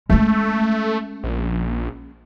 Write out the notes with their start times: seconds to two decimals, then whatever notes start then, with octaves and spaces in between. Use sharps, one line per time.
0.10 G#3 A3 C#4
1.24 A#1